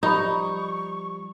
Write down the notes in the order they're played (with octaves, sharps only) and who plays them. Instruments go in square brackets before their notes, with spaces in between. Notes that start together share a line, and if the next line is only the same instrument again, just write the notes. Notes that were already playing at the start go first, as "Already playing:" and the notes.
[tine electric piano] F3 G3 [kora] D#4 [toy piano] B5 D#6 [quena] C#6